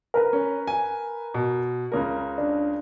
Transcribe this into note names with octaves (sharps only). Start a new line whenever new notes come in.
A#4 B4
C#4
G#5
B2
C#2 C#3 A#4
D4